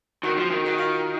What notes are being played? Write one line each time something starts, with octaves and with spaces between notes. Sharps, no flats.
D#3 F#4
F3
D#3
D#3 F#4
F4